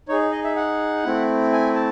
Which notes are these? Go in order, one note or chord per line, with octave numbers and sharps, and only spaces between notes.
D#4 G#4 C#5
D#5
E5
F#5
A3 C4 E4
G#5
A5